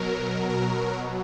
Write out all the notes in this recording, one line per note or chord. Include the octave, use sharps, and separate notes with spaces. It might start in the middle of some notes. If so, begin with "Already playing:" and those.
Already playing: B2 F#3 A#4
A#4